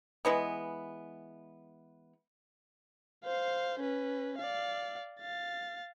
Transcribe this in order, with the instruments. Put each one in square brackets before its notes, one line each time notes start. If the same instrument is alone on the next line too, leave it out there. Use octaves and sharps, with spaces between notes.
[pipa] E3 G#3 B3
[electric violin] C5 F5
C#4 B4
D5 F5
F5 A6